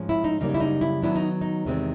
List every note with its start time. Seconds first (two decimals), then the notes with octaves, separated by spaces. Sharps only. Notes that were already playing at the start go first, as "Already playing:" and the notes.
Already playing: G#2 F3 G#3 C#4
0.09 E4
0.24 D#4
0.40 F#2 C#3 E3 G3 A#3 D#4
0.54 E4
0.60 D#4
0.81 E4
1.02 D#3 F#3 B3 D4 E4
1.16 D#4
1.41 D#4
1.65 E2 C3 D#3 G#3 C4